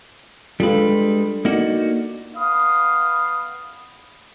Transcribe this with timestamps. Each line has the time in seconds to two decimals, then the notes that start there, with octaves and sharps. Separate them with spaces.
0.60 G3 G#3 D4 F4 A4 B4
1.45 A#3 D#4 F#4 D5
2.35 B3 F5 B5 D#6